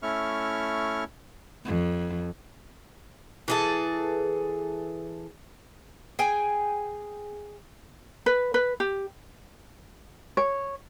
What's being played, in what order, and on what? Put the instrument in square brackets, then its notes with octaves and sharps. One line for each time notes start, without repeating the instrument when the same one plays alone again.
[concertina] A3 C#4 E4 E5 C#6 F6
[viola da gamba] F2
[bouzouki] E3 G#4 A4
G#4 G5 G#5
[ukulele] B4
B4
G4
C#5